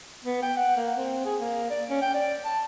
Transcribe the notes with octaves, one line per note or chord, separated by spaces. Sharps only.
B3
G5
F#5
A#3
C4
G#4
A#3
D5
C#4
G5
D5
A5